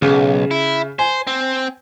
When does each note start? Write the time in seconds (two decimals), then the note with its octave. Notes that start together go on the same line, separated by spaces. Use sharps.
0.02 B1 C#3
0.51 E4
0.99 C5 G#5
1.27 C4